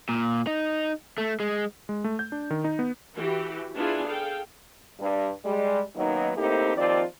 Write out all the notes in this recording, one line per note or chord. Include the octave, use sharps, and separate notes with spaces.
A#2
D#4
A3
G#3
G#3
A3
G6
D4
D#3
D#4
B3
E3 F#4 G4
B3 D4 E4 F4 G#4 G#5
G#4 A4 F5 G5
G2
G3 G#3
F#2 D#3 F#3 A#3 B3 D#4
A2 A3 A#3 C4 D#4 G4
D#2 D#3 F3 C4 F4 D5